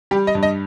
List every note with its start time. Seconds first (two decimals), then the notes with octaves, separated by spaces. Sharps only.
0.11 G3 G4
0.27 D#5
0.35 G2
0.43 D#5